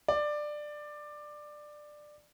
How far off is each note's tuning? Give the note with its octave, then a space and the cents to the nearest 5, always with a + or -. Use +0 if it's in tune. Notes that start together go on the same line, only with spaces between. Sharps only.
D5 +15